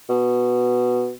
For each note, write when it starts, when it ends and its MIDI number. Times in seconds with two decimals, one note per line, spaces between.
0.09 1.12 47